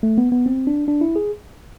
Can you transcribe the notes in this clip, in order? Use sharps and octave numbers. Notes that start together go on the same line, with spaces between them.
A3
B3
B3
C4
D4
D4
E4
G#4